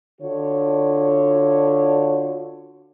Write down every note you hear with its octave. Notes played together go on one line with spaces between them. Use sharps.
D3 F4 F#4 C#5